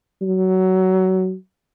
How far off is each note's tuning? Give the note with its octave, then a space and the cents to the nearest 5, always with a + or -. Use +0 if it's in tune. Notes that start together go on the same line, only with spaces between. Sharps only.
F#3 +20